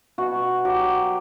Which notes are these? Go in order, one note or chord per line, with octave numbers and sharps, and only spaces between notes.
B2 F#4
F#3 G4